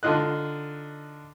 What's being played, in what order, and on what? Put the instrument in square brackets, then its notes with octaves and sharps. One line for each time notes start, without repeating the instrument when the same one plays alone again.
[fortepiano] D3 D#4 F4 D#5 F#6